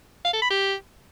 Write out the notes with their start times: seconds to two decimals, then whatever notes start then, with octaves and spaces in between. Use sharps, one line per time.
0.25 F5
0.33 A4
0.42 B5
0.50 G4